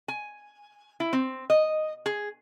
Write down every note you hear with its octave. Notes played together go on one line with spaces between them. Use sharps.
G#5
E4
C4
D#5
G#4